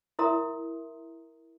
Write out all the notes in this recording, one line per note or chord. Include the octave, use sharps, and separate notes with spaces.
E4 A#4 E5 A#5 C6 D#6